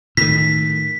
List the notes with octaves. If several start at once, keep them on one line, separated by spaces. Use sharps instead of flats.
A2 D#3 B6